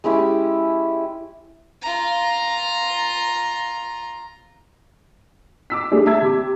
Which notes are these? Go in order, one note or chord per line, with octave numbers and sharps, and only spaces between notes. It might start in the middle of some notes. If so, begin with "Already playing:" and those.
G#3 C#4 E4 G4
F4 A#5
D6 E6 B6
G3 A3 D4 G#4
E5 A5 E6 G#6
C3 D6